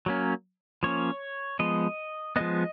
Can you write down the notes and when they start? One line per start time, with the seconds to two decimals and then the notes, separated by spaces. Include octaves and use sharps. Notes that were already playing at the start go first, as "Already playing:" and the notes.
0.06 F#3 A#3 C#4
0.83 F3 A#3 C#4 C#5
1.59 F3 G#3 B3 D#5
2.36 F3 G#3 B3 D#5